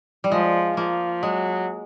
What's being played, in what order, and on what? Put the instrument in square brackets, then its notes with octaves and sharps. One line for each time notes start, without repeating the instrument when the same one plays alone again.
[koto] G3
[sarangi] F3 [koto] G#3
[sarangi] F3 [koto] A#3
[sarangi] F#3 [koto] G#3